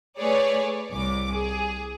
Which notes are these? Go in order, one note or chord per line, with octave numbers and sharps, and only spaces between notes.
A3 G#4 B4 C#5 D5
C2 D6
G#4